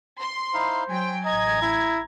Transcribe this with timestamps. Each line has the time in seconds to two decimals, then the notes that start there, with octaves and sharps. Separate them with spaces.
0.22 C6
0.54 D#4 E4 C5 F5
0.89 F#3 G5 G#5
1.25 A1 D#5 A#5 G#6
1.62 E4